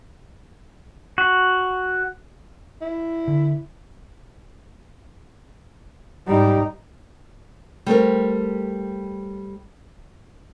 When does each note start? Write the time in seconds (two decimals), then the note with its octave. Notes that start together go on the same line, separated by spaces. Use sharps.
1.18 F#4
2.81 E4
3.28 D3
6.27 G#2 G3 D#4 G4
7.86 G3 A3 C4 A#4